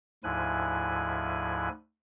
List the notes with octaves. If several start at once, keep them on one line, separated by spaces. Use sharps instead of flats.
D2 G#2 F3 E4 G#5 F#6